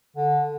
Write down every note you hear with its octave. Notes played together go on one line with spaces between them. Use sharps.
D3